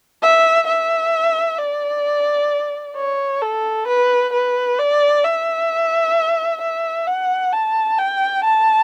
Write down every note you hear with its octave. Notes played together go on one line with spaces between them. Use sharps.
E5
E5
D5
C#5
A4
B4
B4
D5
E5
E5
F#5
A5
G5
A5